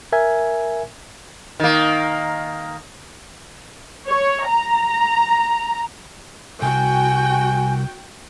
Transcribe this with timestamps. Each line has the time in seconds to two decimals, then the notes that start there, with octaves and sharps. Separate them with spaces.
0.12 A#4 E5 G#5 G#6
1.60 D#3 A#3
4.08 C#5
4.49 A#5
6.62 C2 F#4 G5 G#5